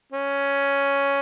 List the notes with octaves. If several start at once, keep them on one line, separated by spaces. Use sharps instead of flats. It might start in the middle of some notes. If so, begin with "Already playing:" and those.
C#4